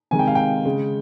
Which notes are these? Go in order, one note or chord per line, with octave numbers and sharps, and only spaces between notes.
C3 D#3 G#3 G#5
G5
F5
G5
C#3 G#3